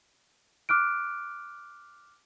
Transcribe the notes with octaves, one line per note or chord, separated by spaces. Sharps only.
D6 F6 F#6 D7